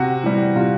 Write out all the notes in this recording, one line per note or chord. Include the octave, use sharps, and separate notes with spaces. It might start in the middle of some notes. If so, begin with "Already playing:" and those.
Already playing: C3 F#4
E3 G3
C3 F4